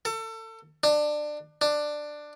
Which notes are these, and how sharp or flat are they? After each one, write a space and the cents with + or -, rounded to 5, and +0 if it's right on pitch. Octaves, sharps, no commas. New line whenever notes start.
A4 +30
D4 +25
D4 +15